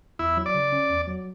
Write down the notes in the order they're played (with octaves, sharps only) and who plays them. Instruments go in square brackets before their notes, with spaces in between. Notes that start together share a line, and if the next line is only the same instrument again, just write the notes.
[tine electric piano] E2 [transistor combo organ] E4
[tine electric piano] F#3
[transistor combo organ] D5
[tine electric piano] C#3
C#4
E2
F#3